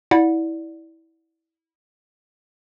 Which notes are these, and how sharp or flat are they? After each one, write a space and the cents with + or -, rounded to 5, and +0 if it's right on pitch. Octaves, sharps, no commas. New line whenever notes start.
E4 -20 D5 +0 F#5 -30